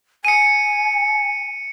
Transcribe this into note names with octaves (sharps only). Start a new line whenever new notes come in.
G#5 C#7 D#7